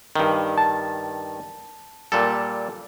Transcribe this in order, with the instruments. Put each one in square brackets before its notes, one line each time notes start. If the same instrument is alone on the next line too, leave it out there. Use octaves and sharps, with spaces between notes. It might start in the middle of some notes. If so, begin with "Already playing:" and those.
[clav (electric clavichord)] G2 D#3
[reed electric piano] A5
[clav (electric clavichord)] A#2 G3 A4